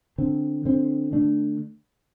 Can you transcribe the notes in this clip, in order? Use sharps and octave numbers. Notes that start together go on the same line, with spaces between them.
D3 C4
D3 C4
D3 A3 D4